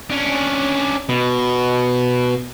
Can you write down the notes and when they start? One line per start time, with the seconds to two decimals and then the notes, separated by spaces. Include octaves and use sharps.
0.10 C#4 D4
1.09 B2